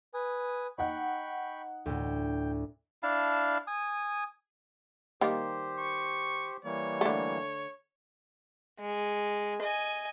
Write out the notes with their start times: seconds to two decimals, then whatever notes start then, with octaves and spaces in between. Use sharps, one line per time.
0.14 B4 G#5 D#6
0.78 D#4 F#5 G5 B5 C#6
1.86 D2 A2 G5
3.03 D4 E4 F5 A5
3.67 G#5 D#6
5.21 D#3 G3 A#3 G4 C5
5.79 C#6
6.65 E3 G3 A#3 C#5
7.01 D3 A3
8.79 G#3
9.62 D#5 G#5